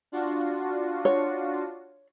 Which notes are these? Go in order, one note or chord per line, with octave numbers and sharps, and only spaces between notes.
D4 F4 F#4
C#5